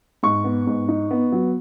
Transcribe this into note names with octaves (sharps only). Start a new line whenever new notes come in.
G#2 C#6
B3
G#2
D#4
B3
F#3